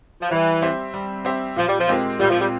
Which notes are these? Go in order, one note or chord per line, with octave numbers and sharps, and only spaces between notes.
F3
E3 G3
C4 G4 C5 E5
G3
C4 G4 C5 E5
A#2 F3
G3
F3
G#3 C4 G4 A#4
A#2 G3
F3
G3